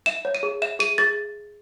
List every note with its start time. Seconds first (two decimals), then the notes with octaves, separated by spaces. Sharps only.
0.06 E5 E7
0.25 C#5
0.35 D#7
0.43 G#4
0.62 E5 E7
0.79 G#4 D#7
0.98 G#4 A6